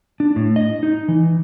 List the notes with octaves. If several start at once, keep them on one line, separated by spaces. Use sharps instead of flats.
D4
A2
D#5
D#4
E3